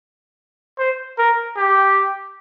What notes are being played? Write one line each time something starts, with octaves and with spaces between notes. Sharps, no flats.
C5
A#4
G4